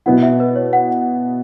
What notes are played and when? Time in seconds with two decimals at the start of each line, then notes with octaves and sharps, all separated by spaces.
0.06 B2 B3 E4 F#5
0.23 E5
0.40 B4
0.56 C#5
0.73 F#5